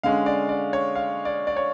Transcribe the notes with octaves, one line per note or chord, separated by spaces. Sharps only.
D3 G#3 C#4 F5
D5
D5
C#5
F5
D5
D5
C#5